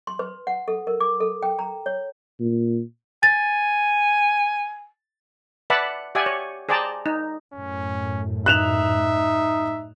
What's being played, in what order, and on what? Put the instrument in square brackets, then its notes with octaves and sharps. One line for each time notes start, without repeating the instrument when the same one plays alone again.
[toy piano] C6
B4
F#5
A4
A#4
D6
A4
G5
A#5
C#5
[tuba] A#2
[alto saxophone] G#5 [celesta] A6
[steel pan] B4 D5 E5 F#5 A5 B5
G4 D5 E5 F#5 G#5
C#5
G#4 C5 D5 G5 A5 A#5
D#4
[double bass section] F#2 A2 [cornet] C#4
[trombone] D#4 [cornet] E5 [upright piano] F#6 E7 F7